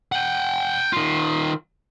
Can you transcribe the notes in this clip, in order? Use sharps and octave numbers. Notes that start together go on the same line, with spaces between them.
F#5 G5
D#3 F4